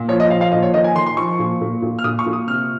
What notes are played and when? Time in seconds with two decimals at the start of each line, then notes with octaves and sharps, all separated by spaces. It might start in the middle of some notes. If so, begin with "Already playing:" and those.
Already playing: A#2
0.08 F3 C#5
0.20 D#5
0.30 F3 F5
0.41 F5
0.52 A#2 D#5
0.62 C#5
0.74 D#3 D#5
0.84 G#5
0.95 D#3 C6
1.06 C6
1.17 F3 C#6
1.39 A#2
1.61 A#2
1.82 A#2
1.99 F6
2.04 A#2 D#6
2.19 C#6
2.26 A#2
2.33 D#6
2.47 C3 F6